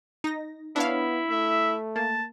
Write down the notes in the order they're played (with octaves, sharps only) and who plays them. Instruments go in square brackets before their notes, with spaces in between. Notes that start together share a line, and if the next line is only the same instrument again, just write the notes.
[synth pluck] D#4 A#6
[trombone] B3 [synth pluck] D4 C#5 F5 [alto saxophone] E4
[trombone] A3 [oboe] E5
[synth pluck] A#3 [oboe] A5